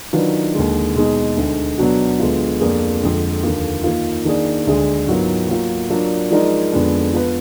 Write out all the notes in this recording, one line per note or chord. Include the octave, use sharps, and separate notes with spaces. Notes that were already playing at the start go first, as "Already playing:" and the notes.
D#3 F#3 D4 F4 B4
D#2 D3 G#3
B2 G#3 D#4 G#4
D2 D3 G#3 D#4
B2 F#3 B3 D4 F#4
D2 D3 G#3 B3 F4
F2 F3 A#3 D4 G#4
F2 D3 G#3
D#2 D3 F3 A#3 F4
D#3 A#3 F4
D#3 A#3 D4 G#4 D5
D2 D3 G#3 D4 G#4
G#2 F#3 B3 F4 A#4
F#3 A#3 F4
F#3 D4 F4 A#4 D5
F3 G#3 D#4 A#4 D5
F2 D3 G#3 B3 D4
F3 B3 F4 B4